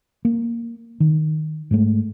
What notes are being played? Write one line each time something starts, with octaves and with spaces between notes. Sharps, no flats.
A#3
D#3
G#2 G#3 A3